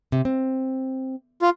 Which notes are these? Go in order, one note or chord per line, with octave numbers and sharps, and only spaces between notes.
C3
C4
F4